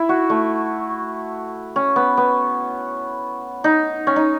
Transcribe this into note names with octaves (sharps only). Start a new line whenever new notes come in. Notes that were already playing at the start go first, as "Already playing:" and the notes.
Already playing: E4
F#4
A3
C#4
B3
B3
D#4
C#4
D#4